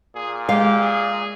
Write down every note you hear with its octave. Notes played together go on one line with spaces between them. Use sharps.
A#2 G#4
G#3 G4 F5
G#4